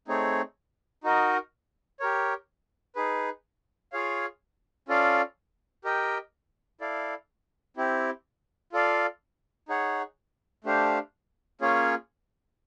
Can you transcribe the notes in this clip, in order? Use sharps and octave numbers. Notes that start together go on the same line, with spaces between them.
A3 C4 D#4 G#4 C#5
D#4 F#4 A#4 D#5
G4 A#4 C#5
D#4 G#4 B4
F4 G#4 C#5 F5
C#4 F4 A4 D5 F5
G4 A#4 D#5 G5
E4 A4 D5 F5
C4 E4 G4
F4 A4 D5 F5
D#4 G#4 C#5 F#5
A3 D4 G4 C5 F5
A#3 C#4 F4 G#4 C#5